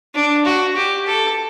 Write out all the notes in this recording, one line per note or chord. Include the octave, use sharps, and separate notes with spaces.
D4
F#4
G4
A4